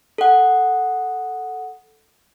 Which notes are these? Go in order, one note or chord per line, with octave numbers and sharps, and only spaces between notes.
A4 F#5